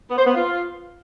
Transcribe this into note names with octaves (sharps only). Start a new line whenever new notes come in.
B3
C5
B3
F4